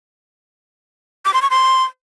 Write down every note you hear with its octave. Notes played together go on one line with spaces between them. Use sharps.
D6
C6
C#6
C6